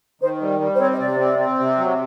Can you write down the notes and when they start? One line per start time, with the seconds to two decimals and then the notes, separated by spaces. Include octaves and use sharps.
0.21 D#3 C5
0.41 G3
0.61 G3
0.75 C5
0.80 C4 C#5
0.94 D#5
0.99 C3 D5
1.19 C4
1.39 C4
1.59 C3
1.78 F#3